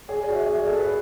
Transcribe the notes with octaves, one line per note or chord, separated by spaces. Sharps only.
G#4 C#5
F#4 D5
E5
G#4
E5
D5
A4
B4
C#5